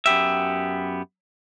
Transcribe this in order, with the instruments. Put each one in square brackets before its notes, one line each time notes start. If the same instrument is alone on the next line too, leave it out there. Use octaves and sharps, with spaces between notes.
[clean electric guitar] F#2 B3 G4 E5